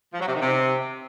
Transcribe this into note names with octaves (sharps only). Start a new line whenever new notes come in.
F3
F#3
C3
D#3
C3